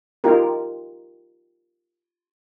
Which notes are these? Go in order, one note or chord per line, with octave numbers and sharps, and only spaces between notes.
D#4 F4 G4 A#4